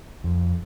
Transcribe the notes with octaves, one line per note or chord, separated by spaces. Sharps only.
F2